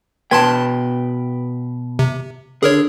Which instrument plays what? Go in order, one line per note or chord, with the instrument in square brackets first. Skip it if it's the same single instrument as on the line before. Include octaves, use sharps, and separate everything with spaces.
[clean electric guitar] B2 B4 G5 [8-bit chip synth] A5 C6 G#6
[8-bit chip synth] C3
[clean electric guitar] D3 [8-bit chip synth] G#4 A#4 C#5